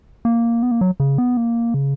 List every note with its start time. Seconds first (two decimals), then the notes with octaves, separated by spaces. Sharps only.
0.25 A#3
0.63 B3
0.71 A#3
0.81 F#3
1.00 C#3
1.18 B3
1.37 A#3
1.74 C#3